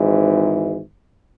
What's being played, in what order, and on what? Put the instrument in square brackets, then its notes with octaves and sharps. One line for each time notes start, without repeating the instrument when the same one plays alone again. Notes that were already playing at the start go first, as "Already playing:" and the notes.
Already playing: [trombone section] G#1 G#2 E3